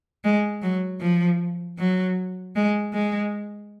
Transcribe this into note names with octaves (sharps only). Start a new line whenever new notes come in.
G#3
F#3
F3
F#3
G#3
G#3